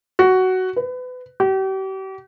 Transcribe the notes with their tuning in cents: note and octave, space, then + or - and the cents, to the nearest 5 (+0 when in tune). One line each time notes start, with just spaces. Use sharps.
F#4 +10
B4 +30
G4 -40